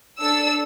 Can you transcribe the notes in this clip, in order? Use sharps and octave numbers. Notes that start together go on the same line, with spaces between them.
D4 A4 E6